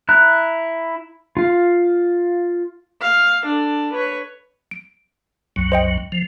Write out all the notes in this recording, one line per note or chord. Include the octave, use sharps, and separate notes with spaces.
E4 A#5 F#6
F4 F5
F5
D4 A4
B4 C#5
D7
C2 F#2 F#3
C5 D#5 G5
F3